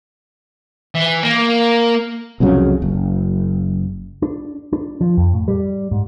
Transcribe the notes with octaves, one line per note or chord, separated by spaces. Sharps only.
E3
A#3
C2 F2 C#3 F#3
F#1
D4
D4
F3
F2
A2
G3
G#2